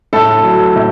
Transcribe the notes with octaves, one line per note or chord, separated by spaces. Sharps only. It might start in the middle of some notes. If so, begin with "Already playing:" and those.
A2 A4
F#3
A2